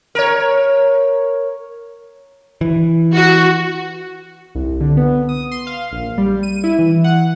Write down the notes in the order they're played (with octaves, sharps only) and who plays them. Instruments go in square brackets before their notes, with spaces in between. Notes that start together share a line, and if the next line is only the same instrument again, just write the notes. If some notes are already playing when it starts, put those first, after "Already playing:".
[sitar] A#4 C#5
[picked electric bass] E3
[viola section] F#4
[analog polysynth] C2
D3
B3
D#6
C6
F5
A#1
G3
D#7
E4
E3
F#5